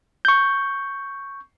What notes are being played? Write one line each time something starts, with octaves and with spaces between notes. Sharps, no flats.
C#6 G6